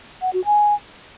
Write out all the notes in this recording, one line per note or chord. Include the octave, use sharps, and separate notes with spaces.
F#5
F#4
G#5